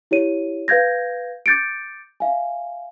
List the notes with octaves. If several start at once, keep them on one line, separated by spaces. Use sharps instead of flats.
E4 G4 C#5 D#7
B4 F5 G6 G#6 A#6
D6 G6 A6 C#7 D7
E5 F5 G#5